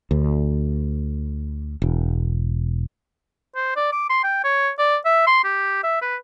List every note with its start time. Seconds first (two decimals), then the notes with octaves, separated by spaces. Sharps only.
0.11 D2
1.82 E1
3.56 C5
3.76 D5
3.92 D6
4.10 C6
4.24 G5
4.44 C#5
4.79 D5
5.06 E5
5.27 C6
5.44 G4
5.83 E5
6.02 B4